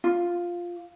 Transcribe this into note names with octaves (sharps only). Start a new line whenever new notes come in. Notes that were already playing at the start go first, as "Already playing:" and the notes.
F4